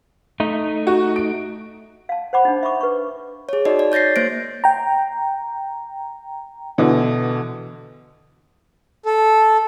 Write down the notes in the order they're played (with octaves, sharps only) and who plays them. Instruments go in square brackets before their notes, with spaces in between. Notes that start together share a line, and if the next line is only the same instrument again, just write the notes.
[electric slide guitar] A3 D#4
[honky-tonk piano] F#4
D7
[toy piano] F5 A5
C5 F#5 B5 D6
D4 D#4
E5 B5 C#6 D6
B4 C#6
[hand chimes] G#4 C#5
D#4 F#4 D5 D#5
D5
C#5 G6 A6 A#6 C7
A#3 C5 A#6 D7
[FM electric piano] G5 A#5
[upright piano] B2 D3 E3
[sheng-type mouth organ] A4